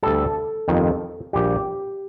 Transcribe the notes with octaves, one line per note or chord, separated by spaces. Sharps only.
D2 D3 G3 A4
G1 F2 D#3
A#1 A#2 G3 G4